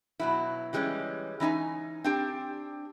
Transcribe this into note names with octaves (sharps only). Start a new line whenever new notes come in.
B2 F#3 E4
E3 G3 G#3 B3 C#4
E3 C#4 D#4 G#5
C4 D4 G4